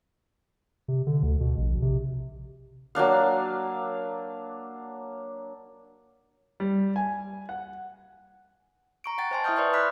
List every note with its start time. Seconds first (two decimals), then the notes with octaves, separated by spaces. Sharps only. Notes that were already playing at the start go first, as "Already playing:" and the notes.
0.88 C3
1.07 D3
1.23 D2
1.40 B2
1.58 A#1
1.82 C3
2.95 F#3 A#3 D4 F5
6.60 G3
6.96 G#5
7.49 F#5
9.04 A#5 C#6 D7
9.18 F#5 G5 A6
9.31 C5 D#5 G#5 A5 C6
9.44 E4 E5 C#6 D#6 F6 G6
9.56 B4 D5 E5 C6 C#6 G6
9.73 B5 F6 F#6 B6